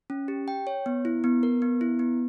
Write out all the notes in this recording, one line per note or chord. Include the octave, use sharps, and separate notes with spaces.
C#4
G4
G5
C#5
B3
E4
B3
A#4
B3
E4
B3